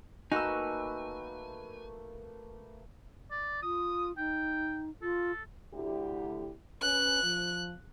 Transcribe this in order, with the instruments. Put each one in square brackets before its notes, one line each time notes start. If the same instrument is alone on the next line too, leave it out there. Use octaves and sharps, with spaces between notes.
[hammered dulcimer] A3 A#3 B4 [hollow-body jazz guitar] D#4 [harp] F#4 E6 [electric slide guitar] G#5
[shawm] D5
[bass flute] F4 [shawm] D#6
[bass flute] D#4 [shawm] G5
[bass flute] F4 [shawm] A4
[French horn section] D2 E4 G4
[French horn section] C#4 B4 [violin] F#6
[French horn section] F3